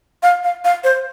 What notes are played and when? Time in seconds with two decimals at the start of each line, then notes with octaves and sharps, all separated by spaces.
0.23 F5
0.44 F5
0.65 F5
0.84 C5